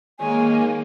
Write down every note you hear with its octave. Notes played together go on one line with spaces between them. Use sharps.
D#3 G#3 A#3 C#5 G#5